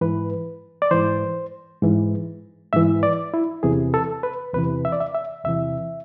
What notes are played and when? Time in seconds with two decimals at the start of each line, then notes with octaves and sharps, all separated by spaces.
0.01 G#2 E3 B4
0.82 D5
0.91 G#2 E3 C5
1.82 G#2 E3
2.73 G#2 E3 E5
3.03 D5
3.34 E4
3.63 E2 C3 E3 G#4
3.94 A4
4.23 B4
4.54 E2 C3 E3 B4
4.85 E5
4.92 D5
5.00 E5
5.15 E5
5.45 E2 C3 E3 E5